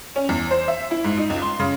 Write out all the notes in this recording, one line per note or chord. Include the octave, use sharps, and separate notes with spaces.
C#4
E2
C5
E5
E4
G#2
D#4
C#2
C6
C#3